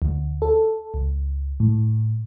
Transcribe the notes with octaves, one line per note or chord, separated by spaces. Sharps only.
D2
A4
C#2
A2